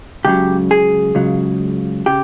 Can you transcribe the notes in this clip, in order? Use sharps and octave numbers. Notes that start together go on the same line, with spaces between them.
C#2 C#3 F#3 G4
G#4
C#2 C#3 F#3
C#3 G4